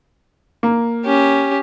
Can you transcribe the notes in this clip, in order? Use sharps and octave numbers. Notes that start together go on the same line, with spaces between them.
A#3
C#4 G4